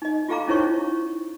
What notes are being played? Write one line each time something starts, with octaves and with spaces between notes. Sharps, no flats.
D#4 D#5
F4 G4 A4 F5 A#5 D6
C#4 D#4 E4 C5 C#5 C#6